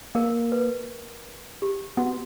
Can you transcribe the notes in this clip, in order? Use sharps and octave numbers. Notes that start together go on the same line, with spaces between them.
A#3 A#4
B4
G4
B3 F#4